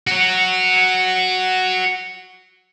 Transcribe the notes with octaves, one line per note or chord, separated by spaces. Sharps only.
F#4 C#5